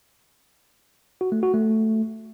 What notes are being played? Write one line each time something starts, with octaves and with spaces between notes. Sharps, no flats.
F#4
A3
F#4
A3